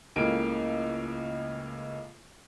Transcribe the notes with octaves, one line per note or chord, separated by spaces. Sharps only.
C#2 A2 C#3 A#3 G5 D7